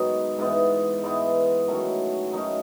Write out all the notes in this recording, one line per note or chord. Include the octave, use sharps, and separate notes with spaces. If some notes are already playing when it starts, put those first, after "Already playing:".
Already playing: G#2 D#3 F#3 B3 D#4 F#4
G#2 E3 B3 D#4
G#2 E3 B3 D#4
D#3 F#3 A3 C#4
D#3 F#3 A3 C#4 D#4